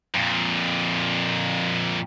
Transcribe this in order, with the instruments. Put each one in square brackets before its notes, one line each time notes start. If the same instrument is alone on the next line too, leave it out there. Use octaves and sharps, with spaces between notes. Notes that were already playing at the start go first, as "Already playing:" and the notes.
[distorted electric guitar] F2 A#2